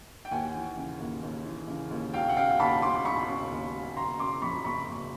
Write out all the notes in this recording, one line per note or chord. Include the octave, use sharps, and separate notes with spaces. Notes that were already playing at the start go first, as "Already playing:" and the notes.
G5
D#2 F#5 G#5
E3
C#3
D#2
D#2
E3
C#3
D#2
E1 F5 G5
F#5
C#3 F5 G5
D#2 A5 B5
E1 C6 D6
E1 B5 C#6
C#3
D#2
E1
F#1 A#5 C6
C#3 C6 D6
F2 B5 C#6
F#1 B5 C#6
F#1